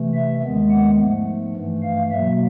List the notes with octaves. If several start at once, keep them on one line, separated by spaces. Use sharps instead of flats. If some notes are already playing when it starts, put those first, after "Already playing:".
Already playing: C3 E3 A3
E5
D#2 D#3 G#3 B3
F#5
G#2 F3 A3
G2 E3 A3
F5
B2 F#3 A#3 E5